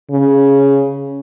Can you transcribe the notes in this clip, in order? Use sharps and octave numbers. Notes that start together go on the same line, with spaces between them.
C#3